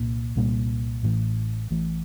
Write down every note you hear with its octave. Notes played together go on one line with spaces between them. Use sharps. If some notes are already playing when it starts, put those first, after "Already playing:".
Already playing: C2 A#2 A#3
C2 A#2 G3 A#3
A1 A2 E3
A1 A2 E3